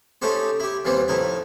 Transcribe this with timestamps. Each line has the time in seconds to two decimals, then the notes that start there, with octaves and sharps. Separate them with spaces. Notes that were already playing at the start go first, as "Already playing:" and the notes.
0.22 A3 C#4 D#4 G4 C5
0.60 E4 G4
0.85 D#2 E3 G3 B3 C4
1.08 F2 A2 D#4 E4